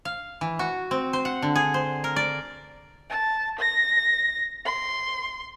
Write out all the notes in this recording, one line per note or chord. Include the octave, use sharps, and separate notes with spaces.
F5
E3
F#4
C4
C5
F#5
D3
G#4
C5
A#4
D5
A5
A#6
C6